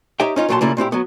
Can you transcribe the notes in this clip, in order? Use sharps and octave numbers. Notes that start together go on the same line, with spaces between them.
D#4 G4 C#5 E5 G5
C#4 D#4 F4
B1 A#2 F#3 F4 A5 C6
C#3 G3 A#3 E4 F4
A#2 C4 E4 G4
F#3 B3